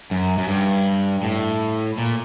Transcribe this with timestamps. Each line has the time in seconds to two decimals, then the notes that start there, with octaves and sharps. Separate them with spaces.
0.11 F#2
0.38 F#2
0.48 G2
1.23 A2
1.98 A#2